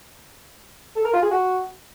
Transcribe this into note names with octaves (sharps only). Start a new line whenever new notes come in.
A4
A#4
F4
G#4
F#4